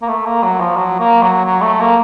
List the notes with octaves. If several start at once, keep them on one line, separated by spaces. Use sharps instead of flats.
A#3
A3
A#3
F#3
F3
F#3
A#3
F#3
F#3
A3
A#3